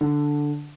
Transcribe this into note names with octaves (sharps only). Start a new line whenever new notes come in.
D3